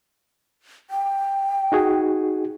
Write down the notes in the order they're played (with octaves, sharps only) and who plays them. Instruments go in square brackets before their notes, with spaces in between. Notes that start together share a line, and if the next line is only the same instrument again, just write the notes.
[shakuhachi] G5
[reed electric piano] D#4 F#4 G#4